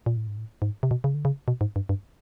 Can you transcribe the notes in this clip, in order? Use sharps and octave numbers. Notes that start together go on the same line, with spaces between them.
A#2
A2
G#2
A2
G#2
C3
B2
C#3
D3
C#3
B2
G#2
G2
G2